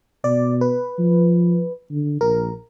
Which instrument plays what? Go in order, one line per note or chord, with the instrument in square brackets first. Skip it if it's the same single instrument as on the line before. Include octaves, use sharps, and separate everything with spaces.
[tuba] B2 [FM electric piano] D5
[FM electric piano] B4
[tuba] F3
D3
[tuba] A#1 [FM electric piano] A#4